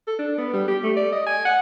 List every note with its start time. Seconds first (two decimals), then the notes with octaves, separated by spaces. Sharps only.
0.07 A4
0.19 D4
0.38 B3
0.53 G3
0.68 G4
0.84 A3
0.97 D5
1.12 D#5
1.27 G#5
1.46 F#5